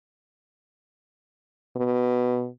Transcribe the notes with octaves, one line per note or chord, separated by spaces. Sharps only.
B2